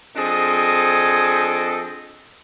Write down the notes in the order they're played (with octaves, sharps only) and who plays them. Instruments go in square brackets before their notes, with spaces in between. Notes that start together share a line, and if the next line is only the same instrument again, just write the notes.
[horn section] F3 C4 D4 G#4 A4 D#5